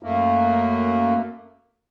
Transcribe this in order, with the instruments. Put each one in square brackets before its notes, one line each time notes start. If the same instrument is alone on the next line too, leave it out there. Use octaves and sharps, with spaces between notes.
[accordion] F#2 A3 A#3